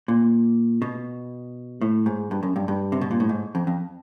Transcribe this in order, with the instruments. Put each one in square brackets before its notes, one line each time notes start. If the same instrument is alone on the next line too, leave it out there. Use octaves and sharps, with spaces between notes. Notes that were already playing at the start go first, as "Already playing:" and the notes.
[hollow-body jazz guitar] A#2
B2
A2
G#2
G2
F#2
G2
G2
C3
B2
A#2
A2
G#2
F2
F2